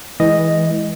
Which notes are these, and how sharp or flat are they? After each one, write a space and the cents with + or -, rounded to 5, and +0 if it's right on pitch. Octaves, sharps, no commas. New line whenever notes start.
E3 -15 G#3 +0 D#5 +0